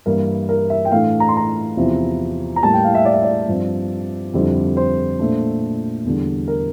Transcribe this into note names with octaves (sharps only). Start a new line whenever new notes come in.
G2 E3 A#3 E4 A#4
A#4
E5
G5
A2 E3 A3 D4 F5
A#5
C6
A#5
E2 C3 F3 C4 E4
A#5
A2 G3 A#3 A5
G5
F5
E5
D5
E5
D5
G2 F3 C4
F2 D3 G3 C4 E4
C5
A#2 A3 D4
E2 D3 G3
A#4